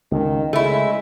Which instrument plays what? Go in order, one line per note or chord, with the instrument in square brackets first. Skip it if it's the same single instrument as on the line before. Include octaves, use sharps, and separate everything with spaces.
[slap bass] C#2 [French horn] D#3
[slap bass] C#3 [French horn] G#3 [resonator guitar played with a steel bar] A3 E4